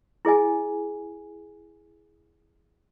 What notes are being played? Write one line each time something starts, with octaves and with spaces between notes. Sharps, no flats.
E4 G#4 D#5 G#5